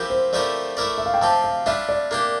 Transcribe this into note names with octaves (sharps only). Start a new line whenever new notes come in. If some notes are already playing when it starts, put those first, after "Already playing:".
Already playing: F3 C4 E4 G4 A#4
C5
F3 A3 E4 G4 A#4 D5
A3 E4 A#4 D5
E5
F5
G5
F3 C4 G4 A5
F5
G3 D4 F4 E5
D5
A#3 D4 G4 A#4